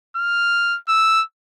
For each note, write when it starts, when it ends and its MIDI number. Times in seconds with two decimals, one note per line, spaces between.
0.16 0.77 89
0.88 1.22 88